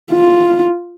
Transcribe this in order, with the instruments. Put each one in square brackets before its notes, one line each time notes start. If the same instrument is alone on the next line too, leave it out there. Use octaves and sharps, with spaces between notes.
[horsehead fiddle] F4